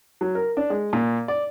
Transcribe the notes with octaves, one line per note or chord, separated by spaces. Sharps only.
F#3
A#4
D4
G#3
A#2
D5